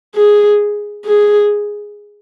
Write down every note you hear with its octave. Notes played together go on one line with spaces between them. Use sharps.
G#4
G#4